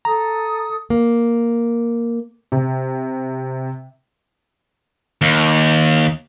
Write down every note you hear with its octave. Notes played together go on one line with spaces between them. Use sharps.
A4 A#5 D#6
A#3
C3
D#2